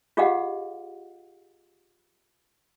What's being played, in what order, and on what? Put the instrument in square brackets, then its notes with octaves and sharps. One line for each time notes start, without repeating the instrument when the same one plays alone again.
[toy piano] F4 G4 G#4 D#5 F5 F#5